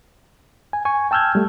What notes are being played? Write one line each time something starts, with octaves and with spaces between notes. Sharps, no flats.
G#5
G#5 C#6
G5 A5 E6 F6 G6 G#6
G3 A3